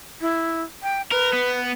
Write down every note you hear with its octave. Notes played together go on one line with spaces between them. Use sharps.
E4
G5
A#4 B4
B3